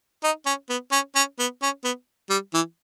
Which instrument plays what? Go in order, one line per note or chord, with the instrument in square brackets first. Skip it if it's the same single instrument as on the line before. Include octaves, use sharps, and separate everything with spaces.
[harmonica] D#4
C#4
B3
C#4
C#4
B3
C#4
B3
G3
E3